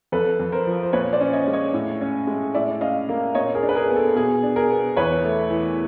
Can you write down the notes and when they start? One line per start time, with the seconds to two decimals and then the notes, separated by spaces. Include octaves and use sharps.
0.12 F2 A4 B4
0.40 F2
0.52 A#4 C5
0.67 F3
0.83 C5
0.93 A#2 B4 C#5
1.13 C5 D5
1.21 C#4
1.33 C#5 D#5
1.48 G#3
1.53 C#5 D#5
1.74 A2
2.01 C#4
2.27 G#3
2.54 A2 D5 E5
2.81 C#4 D#5 F5
3.09 A#3
3.35 A#2 C#5 D#5
3.55 G#4 A#4
3.63 D4
3.69 B4
3.75 G#4 A#4
3.88 B3
3.96 A4
4.15 B2 G#4
4.43 D4
4.56 G#4 A#4
4.70 B3
4.96 E2 B4 C#5
5.24 A3
5.50 E3